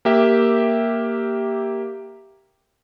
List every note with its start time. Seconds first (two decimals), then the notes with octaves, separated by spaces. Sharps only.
0.05 A#3 G4 E5